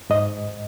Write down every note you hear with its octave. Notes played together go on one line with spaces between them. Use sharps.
G#2 D#5